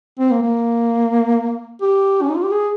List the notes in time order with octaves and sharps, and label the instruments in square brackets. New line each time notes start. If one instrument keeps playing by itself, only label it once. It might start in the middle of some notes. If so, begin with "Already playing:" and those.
[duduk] C4
A#3
A#3
G4
C#4
D#4
F4
G4
G#4